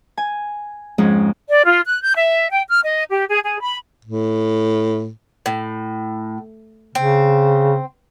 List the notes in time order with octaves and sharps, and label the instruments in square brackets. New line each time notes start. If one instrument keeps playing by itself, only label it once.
[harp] G#5
F2 G#2 G#3 C#4
[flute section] D5
F4
F#6
G6
E5
G5
F6
D#5
G4
G#4
G#4
B5
[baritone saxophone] A2
[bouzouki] A2
[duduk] C#3 [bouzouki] C4